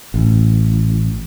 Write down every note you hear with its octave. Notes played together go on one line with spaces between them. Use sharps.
A1